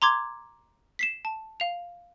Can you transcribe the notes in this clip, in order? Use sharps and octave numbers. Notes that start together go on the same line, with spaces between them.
A#5 C6 D6 G#6
B6 C7 E7
A5
F5 F7